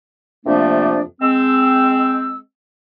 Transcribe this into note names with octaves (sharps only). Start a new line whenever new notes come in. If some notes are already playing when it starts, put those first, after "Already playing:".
F2 C3 F3 A3 A#3 D4
G#3 C4 E6